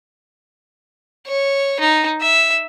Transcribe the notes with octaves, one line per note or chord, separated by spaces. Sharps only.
C#5
D#4
E5